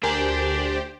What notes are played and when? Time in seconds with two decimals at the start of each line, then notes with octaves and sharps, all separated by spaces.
0.03 D2 D4 G4 A#4 C5 G#5